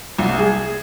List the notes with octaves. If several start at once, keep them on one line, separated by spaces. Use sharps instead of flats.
C2
G#4